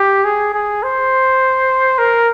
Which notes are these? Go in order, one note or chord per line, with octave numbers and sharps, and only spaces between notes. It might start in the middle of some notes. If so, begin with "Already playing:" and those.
Already playing: G4
G#4
G#4
C5
A#4